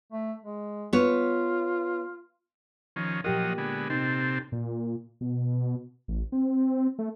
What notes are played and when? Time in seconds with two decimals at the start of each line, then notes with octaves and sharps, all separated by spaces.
0.13 A3
0.44 G#3
0.93 B3 F4 C#5
2.96 D#3 F3 C#4
3.24 A#2 F3 F#3 G4 A#4 D#5
3.58 D3 G#3 B3
3.90 C3 C4 D#4 A4
4.52 A#2
5.21 B2
6.08 A1
6.32 C4
6.99 A3